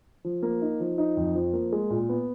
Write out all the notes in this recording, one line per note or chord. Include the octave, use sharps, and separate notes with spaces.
F3
A#3
D#4
F3
D#4
F2
F3
A#3
G#3
A#2
B3